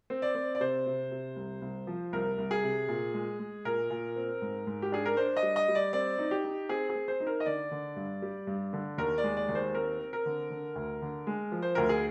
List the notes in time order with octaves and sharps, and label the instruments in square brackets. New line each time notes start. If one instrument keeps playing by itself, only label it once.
[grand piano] C4
D5
C4
D5
C3 C5
C3
C3
C2
C2
F3
C2 A#4
C2
G#4
C3
A#2
G#3
G#3
A#2 A#4
A#2
C4
G#2
G#2
G4
D4 G#4
A#4
D4 C5
D#5
G3
D#5
G3
D5
C4 D5
D#4
G4
D#4
C4 G#4
G#4
C4
C5
D#4
A#4
D#5
D3 D5
D3
G2
G3
G2
D3
D#2 A#4
D5
G#3
D5
D#2
C5
C4 A#4
C4
A#4
D3
D3
D2
D3
G#3
F3
C5
D2 A#4
G#4